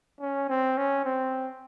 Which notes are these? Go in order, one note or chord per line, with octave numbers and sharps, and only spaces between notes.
C#4
C4
C#4
C4